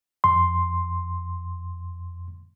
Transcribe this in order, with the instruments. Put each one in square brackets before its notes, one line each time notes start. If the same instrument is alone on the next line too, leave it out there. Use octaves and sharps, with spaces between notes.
[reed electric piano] F2 C6